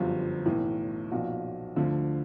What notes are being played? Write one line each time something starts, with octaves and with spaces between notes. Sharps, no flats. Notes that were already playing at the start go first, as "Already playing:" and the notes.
Already playing: G1 F#2 D3 F3 G4
B1 A2 E3
B1 A#2 F3 F#4
D2 D3 F3